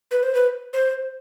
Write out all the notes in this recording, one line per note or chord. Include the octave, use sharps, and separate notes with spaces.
B4
C5
B4
C5